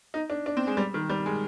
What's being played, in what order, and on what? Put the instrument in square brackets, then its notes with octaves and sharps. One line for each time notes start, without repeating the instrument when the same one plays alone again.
[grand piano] D#4
D4
D4
C4
G#3
G3
D#3
G3
G#3